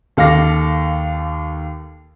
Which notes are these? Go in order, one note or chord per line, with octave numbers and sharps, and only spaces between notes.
D#2 A4 F5 D6 A#6